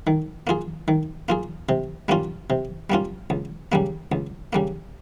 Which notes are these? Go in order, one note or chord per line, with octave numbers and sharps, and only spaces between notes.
D#3
A#3 F4 G#4
D#3
A#3 F4 G#4
C3
G3 A#3 C#4 F4
C3
G3 A#3 C#4 F4
C#2
C#3 G3 A#3
C#2
C#3 G3 A#3